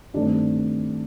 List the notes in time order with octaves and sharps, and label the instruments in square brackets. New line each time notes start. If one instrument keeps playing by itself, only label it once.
[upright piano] G2 D#3 A3 C4 D4 D5